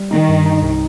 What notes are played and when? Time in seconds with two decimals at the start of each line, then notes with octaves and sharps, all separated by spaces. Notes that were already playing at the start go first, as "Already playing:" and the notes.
Already playing: G3
0.11 D#3 D#4
0.29 G2
0.46 D#4
0.62 C2